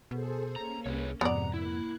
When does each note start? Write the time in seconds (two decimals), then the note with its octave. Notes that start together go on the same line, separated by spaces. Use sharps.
0.11 B2 G#4 A4 C5
0.56 A#3 C#4 A#5
0.86 C2 G#4 B4 C#5
1.21 F2 G#2 C3 B3 D5 F#5 A#5
1.54 A#3 E4 F#6 G#6